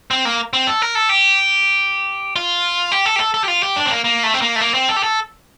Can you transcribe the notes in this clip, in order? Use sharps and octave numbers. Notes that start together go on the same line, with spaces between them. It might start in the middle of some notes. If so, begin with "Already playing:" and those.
C4
A#3
C4
A4
A#4
A4
G4
F4
G4
A4
G4
A4
A4
G4
F4
G4
D4
C4
A#3
A#3
A3
C4
A#3
A3
A#3
C4
A4
G4
A4